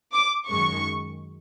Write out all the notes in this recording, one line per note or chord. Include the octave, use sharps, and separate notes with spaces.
D6
F#2 D#3 G#3 C#6